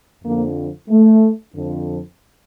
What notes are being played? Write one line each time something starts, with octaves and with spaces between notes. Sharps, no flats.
F2 D3 F3 A#3
A3
F2 D3 F3